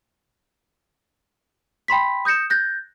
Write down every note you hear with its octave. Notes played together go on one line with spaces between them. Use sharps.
G5 B5 C6 B6
D#6 G6 A#6 C#7 E7
F#6 G6 A6 A#6